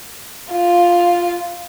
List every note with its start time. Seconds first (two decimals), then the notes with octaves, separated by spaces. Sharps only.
0.53 F4